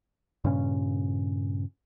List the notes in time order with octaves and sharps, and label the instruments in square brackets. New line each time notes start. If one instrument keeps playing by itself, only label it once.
[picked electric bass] G2 A#2 C#3 C#4